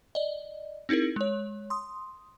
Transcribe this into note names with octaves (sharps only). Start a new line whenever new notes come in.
D5 D#5
C4 D#4 E4 G#4 A#4
G#3 C#5
C6 D#6